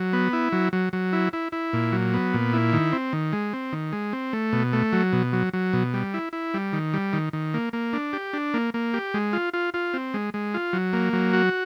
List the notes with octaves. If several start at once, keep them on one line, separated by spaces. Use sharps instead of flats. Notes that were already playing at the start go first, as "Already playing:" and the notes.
Already playing: F#3
B3
E4
F#3
F#3
F#3
E4
E4
E4
A#2
F#3
B3
A#2
E4
D#3
C4
D#3
G#3
C4
D#3
G#3
C4
A3
B2
A3
F#3
B2
F#3
F#3
B2
G3
E4
E4
G3
D#3
G3
D#3
D#3
A#3
A#3
D4
G4
D4
A#3
A#3
G4
G#3
F4
F4
F4
C4
G#3
G#3
F4
F#3
A#3
F#3
F#4